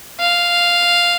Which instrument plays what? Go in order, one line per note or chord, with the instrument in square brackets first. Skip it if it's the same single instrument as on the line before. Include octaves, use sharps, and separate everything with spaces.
[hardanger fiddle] F5